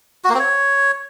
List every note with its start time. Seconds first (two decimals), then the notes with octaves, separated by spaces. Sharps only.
0.24 F#4
0.29 A#3
0.34 C4
0.40 C#5